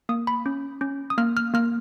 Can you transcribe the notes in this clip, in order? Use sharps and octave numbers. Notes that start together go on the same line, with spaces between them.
A#3 D#6
B5
C#4
C#4
D#6
A#3 F6
F6
A#3 F6